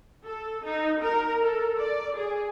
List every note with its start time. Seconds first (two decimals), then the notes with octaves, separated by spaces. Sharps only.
0.25 A4
0.65 D#4
1.02 A#4
1.42 A4
1.77 D5
2.16 G#4